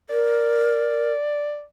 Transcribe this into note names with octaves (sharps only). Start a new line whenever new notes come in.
A#4 D5